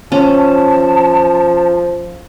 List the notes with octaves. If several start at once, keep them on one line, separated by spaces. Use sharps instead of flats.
F3 C#4 A5